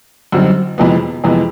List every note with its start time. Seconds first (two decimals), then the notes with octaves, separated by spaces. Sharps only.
0.32 F#2 D3 G3 C4 D#4
0.78 F2 C3 E3 G#3 B3
1.24 F2 C3 E3 G#3 B3